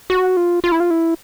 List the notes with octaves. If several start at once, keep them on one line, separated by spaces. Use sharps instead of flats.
F#4
F4
F4
E4
F4
E4